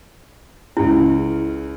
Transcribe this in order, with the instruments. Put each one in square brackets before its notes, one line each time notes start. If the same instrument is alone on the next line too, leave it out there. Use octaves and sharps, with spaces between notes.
[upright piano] C#2 C#3 [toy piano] E4